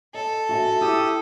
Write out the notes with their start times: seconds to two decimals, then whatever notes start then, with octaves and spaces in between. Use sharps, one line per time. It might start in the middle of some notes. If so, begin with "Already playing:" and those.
0.14 A4 D#5
0.49 F#4 E5 G#5
0.81 E4 G4 D#6 E6